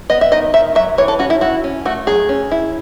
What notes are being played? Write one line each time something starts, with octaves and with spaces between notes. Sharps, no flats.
B3 D#5
E5
D#3 D#5
D#3 E5
F#3 E5
E3 C#5
A4
C#4 F#4
E4
E4 F#4
C#4
A3 F#4
F#3 G#4
C#4
E4